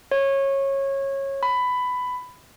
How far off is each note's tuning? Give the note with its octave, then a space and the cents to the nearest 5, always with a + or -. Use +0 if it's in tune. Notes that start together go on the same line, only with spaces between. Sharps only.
C#5 -20
B5 +15